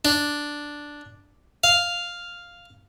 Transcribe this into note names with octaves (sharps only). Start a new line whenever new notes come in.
D4
F5